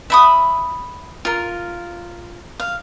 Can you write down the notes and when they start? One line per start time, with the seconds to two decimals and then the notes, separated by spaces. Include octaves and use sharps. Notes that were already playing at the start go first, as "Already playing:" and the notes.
0.10 E5 B5 D#6
1.25 F4 A#4
2.60 F5